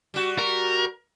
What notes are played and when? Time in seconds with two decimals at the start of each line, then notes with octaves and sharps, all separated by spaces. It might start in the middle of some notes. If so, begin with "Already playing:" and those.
0.14 G3 F#4
0.38 A#4